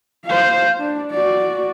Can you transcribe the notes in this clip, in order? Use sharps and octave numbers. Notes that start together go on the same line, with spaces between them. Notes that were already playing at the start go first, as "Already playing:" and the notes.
C5 F5
D4
F#4 D5